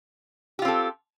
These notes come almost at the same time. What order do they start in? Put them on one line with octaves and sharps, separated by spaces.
G4 F4 C4 A4